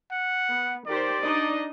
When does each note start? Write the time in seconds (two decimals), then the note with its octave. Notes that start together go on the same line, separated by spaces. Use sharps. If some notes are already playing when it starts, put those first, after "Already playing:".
0.11 F#5
0.50 B3
0.87 D#3 G4 C5 D5
1.21 D4 D#4 D#5